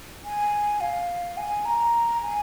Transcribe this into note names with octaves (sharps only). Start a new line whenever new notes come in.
G#5
F5
G#5
A#5
G#5